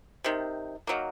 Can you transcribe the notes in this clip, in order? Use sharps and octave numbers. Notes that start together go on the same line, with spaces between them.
C3 D#3
D#3 F#3 A#3